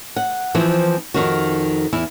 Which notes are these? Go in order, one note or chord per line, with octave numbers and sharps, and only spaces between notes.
F#5
E3 F3 C4
F2 G#2 D#3 F#4
E2 E4